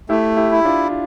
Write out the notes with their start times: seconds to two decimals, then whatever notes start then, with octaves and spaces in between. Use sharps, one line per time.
0.09 A3 E4 G4
0.37 E4 G4
0.51 E4
0.65 D4 F4